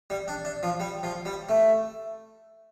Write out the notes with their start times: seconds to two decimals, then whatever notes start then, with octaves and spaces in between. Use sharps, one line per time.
0.10 G3
0.28 D4
0.45 D4
0.63 F3
0.80 G3
1.03 F3
1.25 G3
1.49 A3